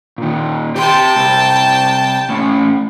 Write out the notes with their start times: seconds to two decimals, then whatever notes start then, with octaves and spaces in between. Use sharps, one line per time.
0.18 A#2 D#3
0.76 G4 G5 A5 C6
1.16 C2
2.30 A2 C#4